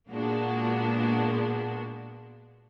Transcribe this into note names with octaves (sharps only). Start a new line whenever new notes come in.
A#2 G#3 A#3 B3 D4 F#4